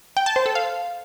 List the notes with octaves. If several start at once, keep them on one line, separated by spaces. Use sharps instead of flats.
G5
A5
C5
A4
F5